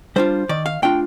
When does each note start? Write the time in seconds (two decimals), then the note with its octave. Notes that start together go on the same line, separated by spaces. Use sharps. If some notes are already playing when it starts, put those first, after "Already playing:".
0.16 G3 D4 F4 C5
0.49 D#3 D5
0.66 F5
0.82 A3 D4 F4 G5